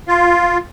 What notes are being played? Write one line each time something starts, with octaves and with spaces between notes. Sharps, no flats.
F4